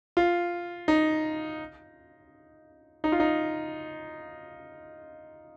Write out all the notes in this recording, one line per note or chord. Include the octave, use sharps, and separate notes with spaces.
F4
D#4
D#4
F4
D#4